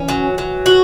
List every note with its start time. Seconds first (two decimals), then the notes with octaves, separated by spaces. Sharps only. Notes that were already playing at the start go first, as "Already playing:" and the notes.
Already playing: E3 C#4
0.08 F#3
0.38 F#3
0.66 F#4